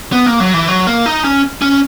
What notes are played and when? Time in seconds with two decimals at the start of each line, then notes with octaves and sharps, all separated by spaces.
0.12 B3
0.26 A#3
0.40 F#3
0.54 E3
0.68 F#3
0.87 A#3
1.06 D#4
1.24 C#4
1.62 C#4